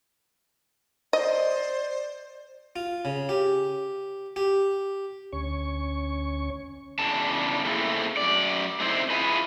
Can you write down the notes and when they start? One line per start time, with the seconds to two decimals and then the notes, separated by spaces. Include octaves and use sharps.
1.13 C5 D5 D#5
2.76 F4
3.05 C#3
3.29 G4
4.36 G4
5.33 D2 C#4 C#5 C#6
6.99 E2 C#3 D4 A5
7.65 A3 A#3 C4 E4 G#4 A4
8.17 F#2 D5
8.80 A3 C4 D#4 E4 C5
9.10 E4 F4 G#4 B4